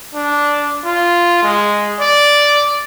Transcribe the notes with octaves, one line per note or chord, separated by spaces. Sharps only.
D4
F4
G#3
D5